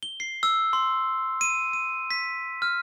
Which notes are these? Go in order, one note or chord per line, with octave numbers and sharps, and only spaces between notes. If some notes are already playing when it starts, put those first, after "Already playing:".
G7
C7
E6
C6
D#7
D#7
B6
F6